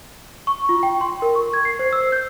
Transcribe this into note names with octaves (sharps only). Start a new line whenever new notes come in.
C#6
F4
G5
C6
A#4
C#6
G#6
C7
C5
E6
G6